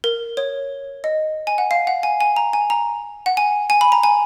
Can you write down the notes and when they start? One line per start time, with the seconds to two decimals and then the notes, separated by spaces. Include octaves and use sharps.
0.04 A#4
0.37 C#5
1.04 D#5
1.47 G#5
1.58 F#5
1.71 F5
1.87 F#5
2.03 G#5
2.21 G#5
2.36 A#5
2.53 G#5
2.70 A#5
3.26 F#5
3.37 G#5
3.70 G#5
3.81 B5
3.92 A#5
4.03 G#5